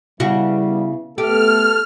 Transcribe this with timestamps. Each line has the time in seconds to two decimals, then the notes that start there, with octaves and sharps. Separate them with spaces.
0.20 C#3 G3 B3 E4 F#4
1.18 A3 B3 G4 A4 F6